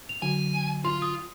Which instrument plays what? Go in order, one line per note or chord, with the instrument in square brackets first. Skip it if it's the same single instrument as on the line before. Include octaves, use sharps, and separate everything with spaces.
[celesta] F7
[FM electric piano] D3 F#3 [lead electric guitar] G#5
[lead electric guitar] F4 [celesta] C6
[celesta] D#6